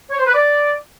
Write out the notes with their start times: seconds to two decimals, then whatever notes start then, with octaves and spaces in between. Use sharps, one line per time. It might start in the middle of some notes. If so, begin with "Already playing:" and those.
0.11 C#5
0.19 C5
0.27 B4
0.34 D5